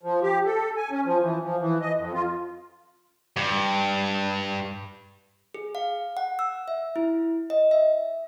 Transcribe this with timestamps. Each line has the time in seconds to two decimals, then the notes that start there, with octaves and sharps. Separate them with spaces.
0.03 F3
0.22 G4
0.46 A4
0.77 G#5
0.91 C#4
1.05 F3
1.21 E3
1.42 F3
1.60 E3
1.81 D#5
1.96 F2
2.14 F4
3.36 G2
5.54 G#4
5.75 F5
6.17 F#5
6.39 E6
6.68 E5
6.96 E4
7.50 D#5
7.71 E5